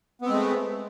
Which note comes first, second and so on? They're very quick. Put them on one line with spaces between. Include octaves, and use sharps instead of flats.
B3 C4 G#3 A3